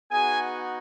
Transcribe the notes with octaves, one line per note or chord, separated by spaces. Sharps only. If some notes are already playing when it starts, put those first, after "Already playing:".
B3 D#4 F#4 G#4 G#5